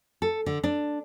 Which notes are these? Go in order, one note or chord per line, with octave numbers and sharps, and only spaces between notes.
A4
D3
D4